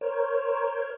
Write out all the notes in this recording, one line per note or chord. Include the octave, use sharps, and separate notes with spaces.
A#4 C5 C#5